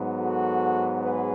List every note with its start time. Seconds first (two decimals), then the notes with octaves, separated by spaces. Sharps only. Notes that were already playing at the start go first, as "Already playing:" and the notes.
Already playing: G#2 F#3 B3
0.18 F#4 A4
1.03 G#4 B4